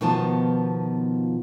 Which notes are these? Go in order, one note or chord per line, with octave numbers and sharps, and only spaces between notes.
B2 D#3 F3 B3 F4 A5